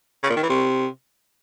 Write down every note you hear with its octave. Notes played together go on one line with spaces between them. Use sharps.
C#3
A#2
D#3
E3
C3